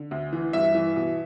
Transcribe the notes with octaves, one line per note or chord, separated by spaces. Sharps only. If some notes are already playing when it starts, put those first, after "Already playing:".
Already playing: D3
D2
E3
G2 E5
E3
B2